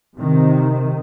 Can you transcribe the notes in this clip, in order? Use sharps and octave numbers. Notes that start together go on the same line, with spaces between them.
C3 D#3